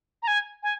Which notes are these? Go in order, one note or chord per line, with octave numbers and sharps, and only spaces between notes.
A#5
G#5
G#5